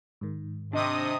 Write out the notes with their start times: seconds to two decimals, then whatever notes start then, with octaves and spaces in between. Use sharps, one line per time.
0.21 G#2 D#3
0.73 C3 C4 D4 D#5 D6 D#6